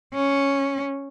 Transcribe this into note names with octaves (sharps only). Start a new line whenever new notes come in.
C#4